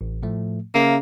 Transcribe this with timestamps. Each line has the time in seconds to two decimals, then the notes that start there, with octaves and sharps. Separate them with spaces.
0.01 A1
0.23 A2 F3 A3
0.74 C#3 A#3 E5 F5 A#5